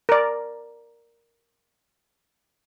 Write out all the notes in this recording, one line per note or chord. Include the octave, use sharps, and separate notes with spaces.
A#4 D5